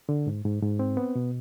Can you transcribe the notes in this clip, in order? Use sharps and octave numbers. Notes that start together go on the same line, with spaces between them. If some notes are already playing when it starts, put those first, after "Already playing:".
D3
G#2
G#2
G#2
C4
B3
B2